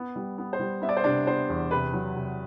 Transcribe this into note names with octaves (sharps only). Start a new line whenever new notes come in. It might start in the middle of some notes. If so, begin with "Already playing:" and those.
Already playing: B3
G3
B3
C5
G3
B3 E5
D5
C5
C3 D4 D5
B3 C5
E2
C3 B4
F#3
C3